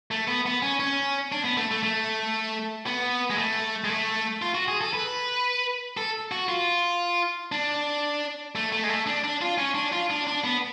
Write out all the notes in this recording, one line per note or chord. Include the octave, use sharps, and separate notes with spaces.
A3
B3
B3
C#4
C#4
D4
B3
A3
A3
A3
B3
G#3
A3
G#3
A3
F4
F#4
G#4
A4
B4
A4
F#4
F4
D4
A3
A3
G#3
A3
D4
D4
F4
C#4
D4
F4
D4
D4
B3